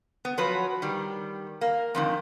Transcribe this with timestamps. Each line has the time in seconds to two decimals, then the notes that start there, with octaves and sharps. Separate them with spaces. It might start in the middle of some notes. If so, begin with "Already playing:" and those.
0.25 B3
0.38 F3 F#3 F#4 B4
0.82 D#3 G3
1.61 A#3
1.95 F2 G#2 D#3